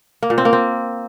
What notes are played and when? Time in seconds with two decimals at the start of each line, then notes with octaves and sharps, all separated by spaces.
0.23 A#3
0.30 A#2
0.38 C4
0.45 A#3
0.53 C4